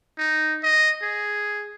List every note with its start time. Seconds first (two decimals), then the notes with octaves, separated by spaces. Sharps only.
0.19 D#4
0.63 D#5
1.02 G#4